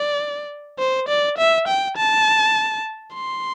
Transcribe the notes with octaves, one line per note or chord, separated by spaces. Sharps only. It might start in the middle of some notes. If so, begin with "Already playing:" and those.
Already playing: D5
C5
D5
E5
G5
A5
C6